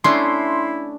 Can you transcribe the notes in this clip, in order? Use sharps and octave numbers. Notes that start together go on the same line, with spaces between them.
A3 C#4 D4 E4 C6